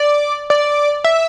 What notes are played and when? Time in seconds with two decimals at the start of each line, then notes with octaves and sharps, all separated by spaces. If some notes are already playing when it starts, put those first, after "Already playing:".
Already playing: D5
0.50 D5
1.04 E5